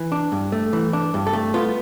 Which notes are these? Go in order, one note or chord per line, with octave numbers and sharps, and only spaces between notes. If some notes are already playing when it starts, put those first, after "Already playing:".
Already playing: E3
D4
G2
A3
E3
D4
G2
A4
A3
B3 F4